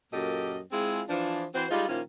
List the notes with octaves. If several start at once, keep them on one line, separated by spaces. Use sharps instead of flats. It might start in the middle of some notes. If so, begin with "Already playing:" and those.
F#2 A#2 A#3 G4 A4 D#5
G#3 C4 E4 F4 G#4
E3 F3 D4
E3 C4 F#4 C5
G3 G#3 D#4 F4
A#2 D#3 F3 A#3 C#4 E4